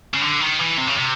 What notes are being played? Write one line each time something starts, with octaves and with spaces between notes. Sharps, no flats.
C#3
D3
D#3
E3
C3
C#3
C3